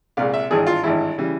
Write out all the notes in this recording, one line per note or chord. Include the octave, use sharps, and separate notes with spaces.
C2 A#2 G#3 F5
E5
G#1 G2 E3 G#3 G#4
F4
G#1 G2 E3 G#3 E4
C#3 E3 G3